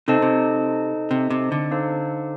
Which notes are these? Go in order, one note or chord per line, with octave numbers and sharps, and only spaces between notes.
C3 D#4 A4 C5 D#5 A5
C3
C3
C3
D3
D#4 A4 C5 F5 A5